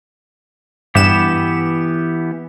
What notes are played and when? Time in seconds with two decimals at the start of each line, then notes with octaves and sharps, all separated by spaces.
0.95 G2 E3 B3 G4 E7